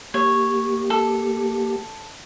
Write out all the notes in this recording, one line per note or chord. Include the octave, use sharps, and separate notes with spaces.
A#3 G4 C#5
A4